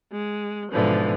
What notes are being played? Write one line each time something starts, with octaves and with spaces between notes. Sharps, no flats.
G#3
G#2 B2 D3 E3 F3